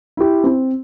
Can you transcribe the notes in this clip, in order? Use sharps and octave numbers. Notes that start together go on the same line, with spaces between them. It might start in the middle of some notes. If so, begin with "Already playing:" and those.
E4 G4
C4